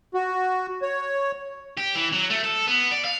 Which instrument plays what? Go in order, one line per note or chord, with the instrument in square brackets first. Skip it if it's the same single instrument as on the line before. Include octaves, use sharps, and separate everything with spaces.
[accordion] F#4
C#5
[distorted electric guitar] G4
E3
F#3
A3
A4
B3
D5
F5